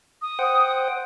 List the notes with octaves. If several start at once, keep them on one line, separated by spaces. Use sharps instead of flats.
D#6
C5 F#5 G5